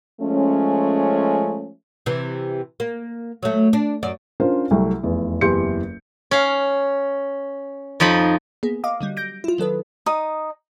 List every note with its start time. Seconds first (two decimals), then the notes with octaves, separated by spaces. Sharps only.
0.21 F3 G#3 A3 C#4
2.06 C3 E3
2.80 A#3
3.43 F#3 A3
3.73 D4
4.03 F#2 D5
4.40 C#4 D4 F4 A#4 C5
4.71 C2 F#3 A3
5.03 F1 E2
5.41 F#1 E2 G4 C6 G6 C#7
6.31 C#4 F5
8.00 F2 F3 D#4 B5
8.63 A#3 B3 G#4
8.84 D#5 F5 D6
9.01 D3 F#3 G3
9.17 G6 A#6 D7
9.44 E4 F4
9.58 D#3 F#3 A4 B4
10.06 D#4 D#6